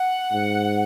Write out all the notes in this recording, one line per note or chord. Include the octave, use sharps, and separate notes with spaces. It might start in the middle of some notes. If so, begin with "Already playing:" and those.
Already playing: F#5
G#2